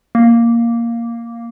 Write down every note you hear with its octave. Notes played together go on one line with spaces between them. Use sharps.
A#3